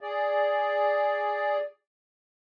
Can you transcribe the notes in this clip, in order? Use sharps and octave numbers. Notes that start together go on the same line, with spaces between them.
G#4 D5